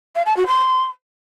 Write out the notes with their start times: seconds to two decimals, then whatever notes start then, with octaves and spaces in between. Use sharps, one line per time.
0.15 F5
0.26 A5
0.37 F#4
0.47 C6